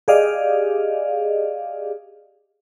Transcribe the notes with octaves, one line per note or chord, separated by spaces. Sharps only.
G4 G#4 D5 D#5 F5